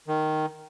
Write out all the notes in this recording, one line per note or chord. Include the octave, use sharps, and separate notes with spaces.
D#3